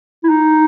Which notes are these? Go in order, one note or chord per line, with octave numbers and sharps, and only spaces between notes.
E4
D#4